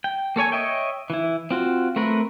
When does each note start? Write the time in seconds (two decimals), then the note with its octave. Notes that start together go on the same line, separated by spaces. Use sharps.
0.04 G5
0.36 A#3 A4 C#5 G#5
0.52 C#5 D#5 E5 G5
1.10 E3 E4
1.51 C4 F4 F#4
1.96 A3 C4 A#4 B4